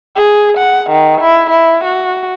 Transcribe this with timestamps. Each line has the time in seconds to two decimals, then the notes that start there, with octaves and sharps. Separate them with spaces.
0.16 G#4
0.58 F#5
0.91 D#3
1.21 E4
1.51 E4
1.84 F#4